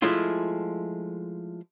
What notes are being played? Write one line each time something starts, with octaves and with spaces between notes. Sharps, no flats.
F3 G#3 A3 E4 F4